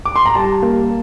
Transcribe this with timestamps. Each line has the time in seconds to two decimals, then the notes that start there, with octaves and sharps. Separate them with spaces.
0.05 D6
0.16 C6
0.26 A#5
0.35 G3 A5
0.62 A#3